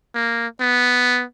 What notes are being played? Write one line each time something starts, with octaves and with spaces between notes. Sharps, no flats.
A#3
B3